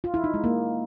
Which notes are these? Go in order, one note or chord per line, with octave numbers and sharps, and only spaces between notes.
F4
E4
D#4
G#3
A#3